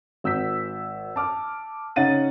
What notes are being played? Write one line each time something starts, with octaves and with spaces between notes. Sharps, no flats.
G#1 E6 G6 B6
A5 D6 F6
C#3 C#4 D#4 F#5 A6 D#7